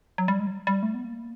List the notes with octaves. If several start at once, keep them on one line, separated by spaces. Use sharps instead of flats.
F#3
G3
G#3
F#3
G3
G3
A3
B3
A#3